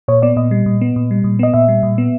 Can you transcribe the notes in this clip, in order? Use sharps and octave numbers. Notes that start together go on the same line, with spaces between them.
A#2 C#5
B3 D5
A#2 D#5
G3
A#2
B3
A#2
G3
A#2
B3 D#5
A#2 E5
G3
A#2
B3